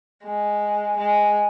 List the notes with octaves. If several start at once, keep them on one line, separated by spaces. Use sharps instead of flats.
G#3
G#3